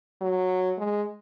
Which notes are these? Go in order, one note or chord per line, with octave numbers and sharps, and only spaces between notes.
F#3
G#3